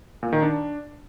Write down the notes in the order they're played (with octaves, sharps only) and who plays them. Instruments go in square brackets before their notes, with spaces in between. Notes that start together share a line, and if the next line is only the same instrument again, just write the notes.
[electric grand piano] A#2
D#3
D4